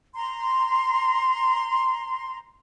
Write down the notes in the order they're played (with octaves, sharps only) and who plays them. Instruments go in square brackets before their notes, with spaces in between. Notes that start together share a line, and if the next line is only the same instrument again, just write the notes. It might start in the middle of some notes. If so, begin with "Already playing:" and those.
[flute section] A#5 C6